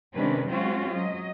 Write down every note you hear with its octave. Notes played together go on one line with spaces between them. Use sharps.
C3 D#3 G#3 C#4 D4 B4
F#3 G#3 C4 C#4 F4 F#4
F#3 D#5